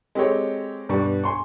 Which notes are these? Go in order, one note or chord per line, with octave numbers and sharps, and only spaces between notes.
G#3 C4 G4 A4 C#5
G2 B2 G3 D4 C#6
G#5 C6 C#6